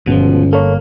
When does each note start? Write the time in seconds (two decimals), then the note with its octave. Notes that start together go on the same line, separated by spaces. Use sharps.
0.07 G1 C#2 B2 F3
0.53 A#3 A4 C#5